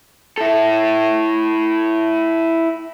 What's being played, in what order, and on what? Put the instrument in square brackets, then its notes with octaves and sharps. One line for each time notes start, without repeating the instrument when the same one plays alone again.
[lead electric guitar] E4 A4